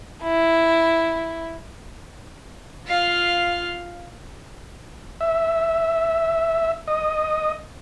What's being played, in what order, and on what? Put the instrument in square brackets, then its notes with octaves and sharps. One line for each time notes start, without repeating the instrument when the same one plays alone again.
[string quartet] E4
[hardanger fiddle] F4 F5
[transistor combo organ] E5
D#5